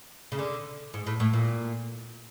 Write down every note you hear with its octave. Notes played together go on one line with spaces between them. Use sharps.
C#3
D3
G#2
A2
A2
A#2